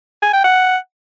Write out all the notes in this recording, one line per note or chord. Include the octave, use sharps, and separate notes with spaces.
G#5
G5
F#5